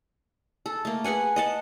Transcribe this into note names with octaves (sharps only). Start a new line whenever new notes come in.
A4
A3 A#3
G#4 B4 F#5 G#5
D#5 F#5 A5